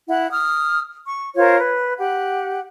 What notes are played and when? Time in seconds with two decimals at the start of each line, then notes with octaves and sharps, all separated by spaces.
0.08 E4 F#5
0.32 D#6 F6
1.06 C#6
1.36 F4 A#4 C5 C#5
1.59 B4
1.98 G4 F#5